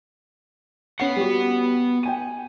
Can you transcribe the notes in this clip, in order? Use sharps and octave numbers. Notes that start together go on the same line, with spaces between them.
B3 C#4 F#5 C7
G3 F#4
G5 G#5 D#7